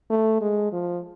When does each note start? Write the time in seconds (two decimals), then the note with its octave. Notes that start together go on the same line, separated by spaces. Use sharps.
0.10 A3
0.41 G#3
0.72 F3